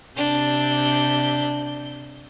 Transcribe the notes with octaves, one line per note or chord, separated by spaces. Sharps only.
C3 D4 G6